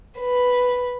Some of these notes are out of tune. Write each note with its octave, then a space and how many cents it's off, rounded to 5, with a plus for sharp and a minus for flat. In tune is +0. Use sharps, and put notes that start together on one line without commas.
B4 +0